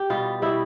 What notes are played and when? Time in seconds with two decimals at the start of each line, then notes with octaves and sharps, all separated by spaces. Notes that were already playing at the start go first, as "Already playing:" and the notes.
Already playing: G4
0.10 B2 G3 F4
0.42 B2 G3 E4